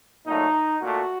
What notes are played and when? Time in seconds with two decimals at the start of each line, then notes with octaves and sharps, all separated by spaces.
0.26 A#2 F#3 A3 D#4
0.81 A#2 A3 F#4